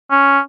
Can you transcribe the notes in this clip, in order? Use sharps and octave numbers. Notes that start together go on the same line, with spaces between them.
C#4